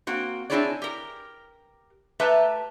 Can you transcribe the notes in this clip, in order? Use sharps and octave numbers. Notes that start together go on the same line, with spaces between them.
A#3 C4 F#4
C4 D4 E4 G#4 C#5 D5
G4 A#4
A3 G4 B4 E5 A5 A#5